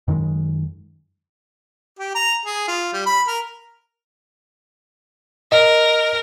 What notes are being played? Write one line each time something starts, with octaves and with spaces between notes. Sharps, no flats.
F#2 D#3 F#3 G#3
G4
A#5
G#4
F4
G3
B5
A#4
A#4 D#5